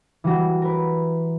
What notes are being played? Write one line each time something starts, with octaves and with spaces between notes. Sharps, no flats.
E3 G3 F#4
A#4 B4